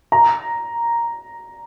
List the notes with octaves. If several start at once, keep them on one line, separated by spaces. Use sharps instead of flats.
A#5